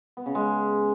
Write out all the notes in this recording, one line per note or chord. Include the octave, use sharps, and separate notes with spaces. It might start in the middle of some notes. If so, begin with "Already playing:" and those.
B3
C#3
G#3